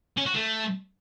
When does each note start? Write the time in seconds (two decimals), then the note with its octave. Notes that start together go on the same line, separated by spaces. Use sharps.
0.17 C#4
0.26 F#4
0.35 A3